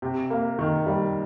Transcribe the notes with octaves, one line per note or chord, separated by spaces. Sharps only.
C3
A#3
D#3
G3